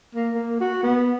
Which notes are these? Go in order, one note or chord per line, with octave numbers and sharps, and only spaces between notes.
A#3
A#3
F#4
B3